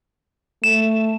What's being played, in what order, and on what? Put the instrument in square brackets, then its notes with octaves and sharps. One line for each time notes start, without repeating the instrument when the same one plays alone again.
[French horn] A3 [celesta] E7